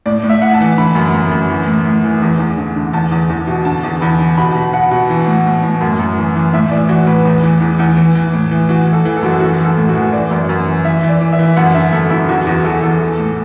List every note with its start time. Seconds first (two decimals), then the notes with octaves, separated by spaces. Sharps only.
0.06 A2 D5
0.23 A2
0.29 E5
0.42 A2 F#5
0.54 A5
0.60 E3
0.77 D3 B5
0.95 F#2
1.14 F#2
1.32 F#2
1.50 E3
1.67 A2
1.86 A2
2.04 E3
2.22 E2
2.39 E2
2.57 D3
2.76 D3
2.93 E2 A5
3.11 E2
3.29 E2
3.47 B2
3.65 D3 A5
3.83 E2
4.01 E2 B5
4.20 D3
4.38 B2 B5
4.55 B2
4.73 B2 F#5
4.91 B2
5.10 E3
5.27 A2
5.46 A2
5.63 A2
5.81 F#2
5.99 F#2
6.17 E3
6.35 E3
6.53 A2 E5
6.71 E3 D5
6.89 E3 F#4
7.06 A2 B4
7.25 E2
7.43 E3
7.61 E2
7.79 E2
7.97 E3
8.15 E3
8.33 A2
8.51 E3
8.69 E3 F#4
8.87 E3
8.93 A4
9.05 E3
9.16 A4
9.23 F#2 F#4
9.33 A4
9.40 E3 F#4
9.58 E3
9.65 A4
9.77 A2
9.89 F#4
9.95 E3
10.13 E3 D5
10.31 F#2
10.49 F#2
10.67 E3
10.84 E3 E5
11.03 E3
11.09 D5
11.21 E3
11.33 E5
11.39 E3
11.56 F#2 F#5
11.74 D3 E5
11.93 F#2 A4
12.10 F#2 E4
12.28 E2 F#4
12.47 E2 F#4
12.64 E3 A4
12.82 E2 A4
13.00 E3
13.19 A2